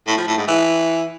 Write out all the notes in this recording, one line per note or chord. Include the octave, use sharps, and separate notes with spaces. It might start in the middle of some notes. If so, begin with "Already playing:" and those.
A2
F3
A2
G#2
E3